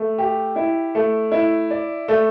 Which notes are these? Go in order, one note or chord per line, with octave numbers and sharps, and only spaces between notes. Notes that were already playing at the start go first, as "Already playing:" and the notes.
Already playing: A3
G4
E4
A3
E4
D5
A3